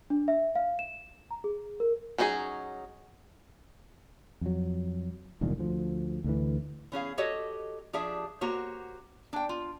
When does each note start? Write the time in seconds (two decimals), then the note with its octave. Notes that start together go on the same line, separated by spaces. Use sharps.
0.10 D4
0.28 E5
0.55 F5
0.79 E7
1.31 A#5
1.44 G#4
1.80 A#4
2.18 F#3 C#4 D#4 E4 G#4
4.41 F2 F#3
5.41 E1 C2 A#2 D#3
5.58 D2 F3
6.24 D2 D3 E3
6.92 E3 C#4 G#4 F5
7.18 F#4 G4 A4 C#5 D#5
7.93 F3 D4 G4 G#4 E5
8.41 A#3 F#4 G4 C5 C#5
9.33 D4 G5
9.49 F4